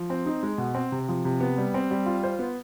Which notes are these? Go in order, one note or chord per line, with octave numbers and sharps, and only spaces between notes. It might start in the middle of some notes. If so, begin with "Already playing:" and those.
Already playing: F3
C4
D#4
G#3
B2
C4
C3
F3
C3
B3
G3
C4
G3
F4
C5
B3